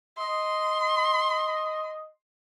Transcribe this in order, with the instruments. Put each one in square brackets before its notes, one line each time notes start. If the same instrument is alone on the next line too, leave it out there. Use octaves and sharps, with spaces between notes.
[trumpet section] D#5 [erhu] C6